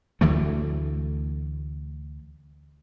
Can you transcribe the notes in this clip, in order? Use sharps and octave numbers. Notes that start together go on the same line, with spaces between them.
D2 E3 A3